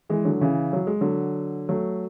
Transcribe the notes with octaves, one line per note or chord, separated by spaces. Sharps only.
E3 G#3
D3 F#3
C#3 E3
F#3
G#3
D3 F#3
F#3 A3